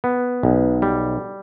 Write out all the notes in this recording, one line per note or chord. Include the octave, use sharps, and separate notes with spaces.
B3
B1
G3